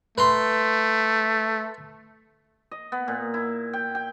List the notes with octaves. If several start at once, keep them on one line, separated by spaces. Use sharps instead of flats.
A3 B4 A#5 C6
D#5
B3
A#2
E4
G5
G5